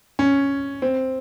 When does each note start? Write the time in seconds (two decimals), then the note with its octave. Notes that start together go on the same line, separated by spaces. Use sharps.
0.19 C#4
0.82 C4